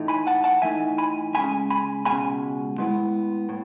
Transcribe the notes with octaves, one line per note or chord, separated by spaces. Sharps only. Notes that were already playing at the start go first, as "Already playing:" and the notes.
Already playing: A2 E3 A3 D#4
G#5 B5
F#5 A5
F#5 A5
A2 E3 A3 D#4 E5 G#5
G#5 B5
C#2 B2 G#3 C#4 G#5 B5
G#5 B5
C#2 B2 G#3 C#4 G#5 B5
A2 G#3 B3 E4
A2